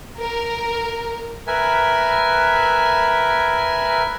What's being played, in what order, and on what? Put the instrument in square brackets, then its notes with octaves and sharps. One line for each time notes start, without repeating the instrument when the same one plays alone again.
[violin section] A#4
[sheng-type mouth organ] A#4 B4 E5 G#5